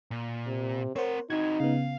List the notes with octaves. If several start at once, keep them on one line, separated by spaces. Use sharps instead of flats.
A#2
C3
C4 A#4 C5 C#5 F#5
C4 D#4 F#4 G#6
C#3 B3 F5